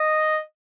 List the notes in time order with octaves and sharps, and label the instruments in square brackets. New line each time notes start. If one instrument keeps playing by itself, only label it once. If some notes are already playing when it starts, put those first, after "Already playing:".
Already playing: [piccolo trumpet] D#5